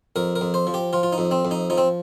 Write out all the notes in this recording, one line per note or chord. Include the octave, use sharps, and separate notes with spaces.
F2 A#4
A#4
F2
C5
F3
G4
F3 F4
F4
D#4
F2
C4
F2
D#4
F3 D#4
C4